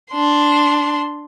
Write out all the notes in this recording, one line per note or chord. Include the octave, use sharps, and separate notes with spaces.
D4 C6